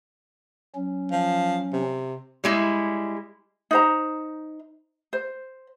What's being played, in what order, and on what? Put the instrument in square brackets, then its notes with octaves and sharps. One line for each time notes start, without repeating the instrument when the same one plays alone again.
[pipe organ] F#3 C#4
[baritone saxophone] F3
C3
[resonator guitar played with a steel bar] G3 G#3 E4
[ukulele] D#4 C5 A#5
C5